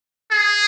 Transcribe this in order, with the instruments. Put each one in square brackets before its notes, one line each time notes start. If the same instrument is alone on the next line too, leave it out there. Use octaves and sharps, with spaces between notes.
[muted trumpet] G#4